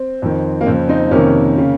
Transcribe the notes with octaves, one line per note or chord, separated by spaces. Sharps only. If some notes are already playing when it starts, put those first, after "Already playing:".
Already playing: C4
F2 D#3
A#3
F2 C#3 C4
C4 D#4
F2 C3 D#3 A#3 C#4
C#3